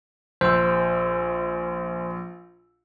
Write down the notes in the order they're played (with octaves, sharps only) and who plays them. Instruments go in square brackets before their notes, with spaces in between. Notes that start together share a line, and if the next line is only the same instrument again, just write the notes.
[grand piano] A#1 E6 [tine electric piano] C5